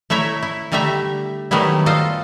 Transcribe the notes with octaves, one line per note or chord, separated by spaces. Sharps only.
A3 E4 C#5 E5 A#5
E4
D3 G3 A3 G4 E5 A#5
D#3 F#3 G3 A3 B3 E4
F4 A4 C5 D#5